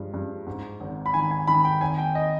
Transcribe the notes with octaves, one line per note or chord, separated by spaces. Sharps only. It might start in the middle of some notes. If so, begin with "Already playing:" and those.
Already playing: G2 F3 G#3
G2
G#2
G#1
B5
D#3 G#5
G#5
D#3 B5
G5
G#1 G#5
G5
D#5